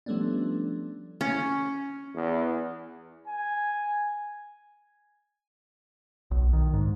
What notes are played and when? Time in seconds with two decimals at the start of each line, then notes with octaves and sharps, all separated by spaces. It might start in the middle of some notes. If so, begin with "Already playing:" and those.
0.06 F3 G3 A3 B3 C#4 D4
1.21 C#4
2.14 E2
3.27 G#5
6.31 B1
6.53 D#3
6.74 G#2